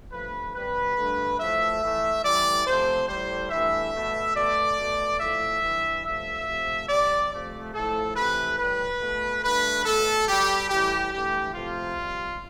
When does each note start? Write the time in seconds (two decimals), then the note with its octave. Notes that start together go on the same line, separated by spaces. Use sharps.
0.11 G2 F3 A3 B4
0.54 C3 G3 B4
0.97 G2 D3 A3
1.39 A2 F3 A3 E5
1.81 A2 E3 A3
2.23 A2 E3 G3 D5
2.65 C3 F3 A3 C5
3.08 A2 G3 C5
3.51 G2 E3 A3 E5
3.93 B2 A3
4.35 B2 A3 D5
4.78 B2 A3
5.19 A2 F3 A3 E5
5.61 G2 E3 G3
6.04 G2 F3 A3 E5
6.47 C3 F3 A3
6.88 C3 G3 D5
7.31 C3 F3 A3
7.74 A2 F3 A3 A4
8.16 C3 E3 A3 B4
8.58 A2 G3 B4
9.00 B2 A3
9.43 G2 D3 A3 B4
9.85 B2 A3 A4
10.28 B2 G3 G4
10.69 A2 E3 G3 G4
11.12 G2 E3 A3 G4
11.54 C3 F3 A3 F4
11.97 C3 G3